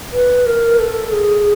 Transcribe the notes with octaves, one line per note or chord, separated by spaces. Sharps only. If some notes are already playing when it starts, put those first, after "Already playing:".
B4
A#4
A4
G#4